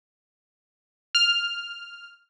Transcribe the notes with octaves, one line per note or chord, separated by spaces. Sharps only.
F6